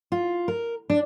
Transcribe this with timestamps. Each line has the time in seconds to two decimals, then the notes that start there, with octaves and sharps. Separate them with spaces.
0.12 F4
0.48 A#4
0.90 D4